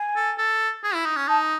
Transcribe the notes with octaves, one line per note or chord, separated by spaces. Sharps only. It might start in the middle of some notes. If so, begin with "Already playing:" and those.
Already playing: G#5
A4
A4
G#4
E4
D#4
C#4
D#4 A5